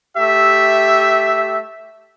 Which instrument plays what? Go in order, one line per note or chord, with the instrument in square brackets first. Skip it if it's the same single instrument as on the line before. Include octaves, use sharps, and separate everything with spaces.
[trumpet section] A3 G4 E5